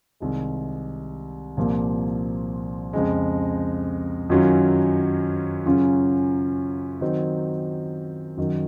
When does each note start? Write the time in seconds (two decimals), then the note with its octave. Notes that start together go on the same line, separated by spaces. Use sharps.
0.20 C2 C3 D#3 G#3
1.57 C2 A#2 F3 A#3
2.93 F2 C#3 G#3
4.30 F#2 D#3 F#3 C#4 F4
5.66 F#2 C#3 F#3 C#4 F4
7.01 D#3 F#3 C4 D#4
8.37 F#2 D#3 F#3